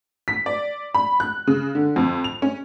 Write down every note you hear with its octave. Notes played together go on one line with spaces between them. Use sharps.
B6
D5
B5
F#6
C#3
D3
F2
F7
C#4